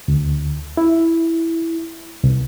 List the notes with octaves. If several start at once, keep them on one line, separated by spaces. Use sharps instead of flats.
D2
E4
C2